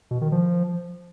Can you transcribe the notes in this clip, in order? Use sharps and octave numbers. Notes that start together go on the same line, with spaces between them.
B2
D#3
F3